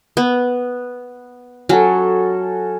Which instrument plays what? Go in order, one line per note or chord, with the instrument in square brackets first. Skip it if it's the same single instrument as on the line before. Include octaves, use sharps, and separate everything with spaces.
[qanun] B3
[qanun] F#3 [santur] C#4 F#4 A4